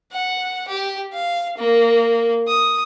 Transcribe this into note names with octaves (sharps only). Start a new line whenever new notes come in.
F#5
G4
F5
A#3
D#6